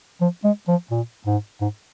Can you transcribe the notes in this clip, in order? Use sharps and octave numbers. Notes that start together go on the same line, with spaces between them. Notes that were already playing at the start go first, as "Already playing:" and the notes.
F3
G#3
F3
A#2
G#2
G#2